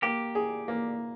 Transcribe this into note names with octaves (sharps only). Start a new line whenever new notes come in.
A#3 G4
G#4
A#3